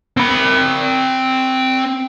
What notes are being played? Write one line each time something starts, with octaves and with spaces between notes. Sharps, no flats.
C4 B5